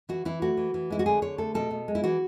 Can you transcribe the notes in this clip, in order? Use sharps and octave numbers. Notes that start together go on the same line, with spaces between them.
E3 F#4
E3 E4
A3 F#4
E3
E3
G#3 E4
F#4
D3 G#4
D3 C#5
A3 A4
B2 A4
B2
G#3
E4
E3 F#4